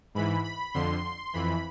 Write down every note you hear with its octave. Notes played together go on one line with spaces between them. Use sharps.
G#2 E3 B5
B5
F2 D3 C6
F2 E3 B5